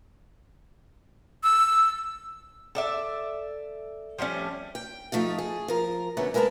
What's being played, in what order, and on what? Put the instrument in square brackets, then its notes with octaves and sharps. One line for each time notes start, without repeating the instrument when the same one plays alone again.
[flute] E6
[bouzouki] A4 D5 E5
F3 G3 A3 C#4
[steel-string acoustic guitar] G5
F3 A3 D#4 F4
G#4
F3 A#4
F#2 D3 A3 B3 C#4
G#3 A#4 B4 E5 A5